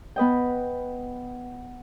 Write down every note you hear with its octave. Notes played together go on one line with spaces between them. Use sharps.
B3 B4 D#5 G5